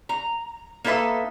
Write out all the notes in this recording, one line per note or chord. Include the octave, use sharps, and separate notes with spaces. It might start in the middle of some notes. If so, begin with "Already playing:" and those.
A#5
A#3 D#4 A4 B4 E5